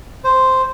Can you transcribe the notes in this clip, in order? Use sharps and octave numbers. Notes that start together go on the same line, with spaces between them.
C5